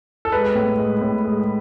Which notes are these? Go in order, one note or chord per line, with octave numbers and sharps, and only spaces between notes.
A4
G#3 B4
A2
G#3
A2
G#3